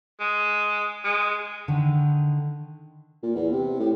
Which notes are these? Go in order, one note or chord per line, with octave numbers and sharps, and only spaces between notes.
G#3
G#3
D3 D#3
A#2
E2
C3
A2